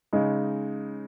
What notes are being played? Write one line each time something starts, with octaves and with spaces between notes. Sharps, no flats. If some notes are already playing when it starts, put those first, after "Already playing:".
C#3 G#3 D#4